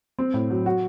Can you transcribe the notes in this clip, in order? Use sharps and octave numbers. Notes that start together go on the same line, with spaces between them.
C4
A2
F#3
F#4